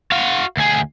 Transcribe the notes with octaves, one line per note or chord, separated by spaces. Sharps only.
F#4 F5
D2 G#4